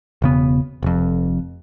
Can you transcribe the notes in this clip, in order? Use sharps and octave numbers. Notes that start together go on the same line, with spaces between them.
E1 C#3 B3
F1 F2